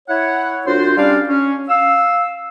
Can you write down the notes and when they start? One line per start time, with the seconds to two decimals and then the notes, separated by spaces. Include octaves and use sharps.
0.09 E4 C#5 F#5
0.67 C2 D4 F4 F#4 C5
0.97 G3 C#4 D4 D5 F5
1.29 C#4
1.69 F5 E6